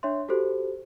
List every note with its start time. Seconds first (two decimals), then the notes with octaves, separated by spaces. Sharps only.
0.03 D4 C#5 E5 C6
0.29 F#4 G4 A4 C5